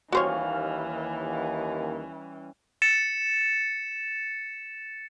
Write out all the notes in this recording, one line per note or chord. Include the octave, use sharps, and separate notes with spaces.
D#2 E3 G3 C#4 F#4 C5 C#5 F5
A6 C#7 E7